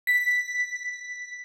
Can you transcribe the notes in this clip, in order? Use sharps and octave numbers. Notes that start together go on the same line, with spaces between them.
B6